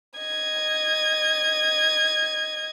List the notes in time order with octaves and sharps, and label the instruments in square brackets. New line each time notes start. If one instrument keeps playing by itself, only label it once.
[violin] D#5 G#6